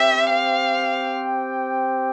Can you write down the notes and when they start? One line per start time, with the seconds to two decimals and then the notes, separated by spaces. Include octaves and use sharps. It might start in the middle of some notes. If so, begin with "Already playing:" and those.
Already playing: C4 G4 C5 E5 G5
0.30 F5